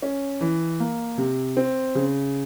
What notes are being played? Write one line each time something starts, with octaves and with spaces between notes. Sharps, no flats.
C#4
E3
A#3
C3
C4
C#3